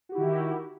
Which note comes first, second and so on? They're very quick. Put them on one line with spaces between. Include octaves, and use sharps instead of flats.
F#4 G4 E4 D#3